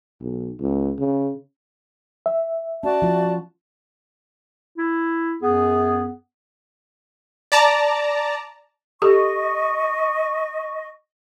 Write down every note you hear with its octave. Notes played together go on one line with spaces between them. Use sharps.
B1
C#2
C#3
E5
C#4 F#4 D5 A5
F3 F4
E4
F#2 B3 G#4
D5 A5 A#5
G4 A4 D#5 C#6